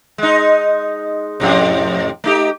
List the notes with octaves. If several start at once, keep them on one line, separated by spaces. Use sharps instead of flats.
G#3 D#4
F2 A2 C3
A3 D#4 G4